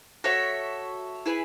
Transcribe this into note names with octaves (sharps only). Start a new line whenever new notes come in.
F#4 A4 C#5 E5
E4 G#4 B4